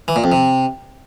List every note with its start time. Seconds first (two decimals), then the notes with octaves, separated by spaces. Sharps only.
0.08 E3
0.16 A#2
0.24 F2
0.32 C3